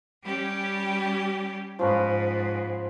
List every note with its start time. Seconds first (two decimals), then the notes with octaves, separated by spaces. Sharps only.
0.24 G3 C#4 G4
1.79 G#2 F3 C#4 B4